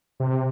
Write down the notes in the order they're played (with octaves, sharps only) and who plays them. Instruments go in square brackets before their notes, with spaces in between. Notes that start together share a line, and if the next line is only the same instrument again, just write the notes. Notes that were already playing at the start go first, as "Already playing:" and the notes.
[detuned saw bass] C3